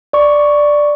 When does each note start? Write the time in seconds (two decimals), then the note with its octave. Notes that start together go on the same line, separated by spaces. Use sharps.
0.13 D5 C#6